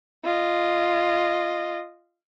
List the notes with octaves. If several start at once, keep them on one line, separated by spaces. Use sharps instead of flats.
F4 D#5